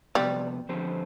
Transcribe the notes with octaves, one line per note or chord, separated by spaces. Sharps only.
C3 F3 G3 B3
D3 F3 C4 G4 C5